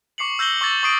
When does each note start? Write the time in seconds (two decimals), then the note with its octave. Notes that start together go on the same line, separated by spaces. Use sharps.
0.18 C#6 D6 C7 C#7 F#7
0.39 E6 G6 A#6 F#7 G7
0.61 C#6 D6 E6 A6 F#7
0.83 C#6 D#6 C7 D7